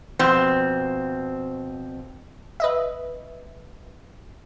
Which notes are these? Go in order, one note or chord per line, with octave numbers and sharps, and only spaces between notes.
F2 B2 C4
B4 D#5 E5